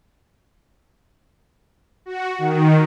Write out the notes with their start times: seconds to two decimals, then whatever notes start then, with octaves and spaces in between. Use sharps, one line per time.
2.06 F#4
2.38 D#3